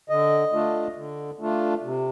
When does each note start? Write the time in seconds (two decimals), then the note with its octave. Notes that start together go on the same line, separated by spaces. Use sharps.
0.09 D3 D#5
0.53 A3 D4 F4
0.96 D3
1.40 A3 D4 F4
1.83 C3